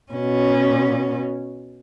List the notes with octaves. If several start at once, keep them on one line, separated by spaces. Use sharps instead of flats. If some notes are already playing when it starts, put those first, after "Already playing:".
B2 C#4